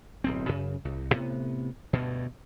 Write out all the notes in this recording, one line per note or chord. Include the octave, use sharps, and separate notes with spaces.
D1 B1 C4
F#2 C#3
C2
A2 C3 B3
D2 G2 B2